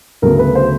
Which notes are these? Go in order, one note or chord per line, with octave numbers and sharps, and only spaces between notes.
D2 C#3 F#3 B3 A#4
B4
C5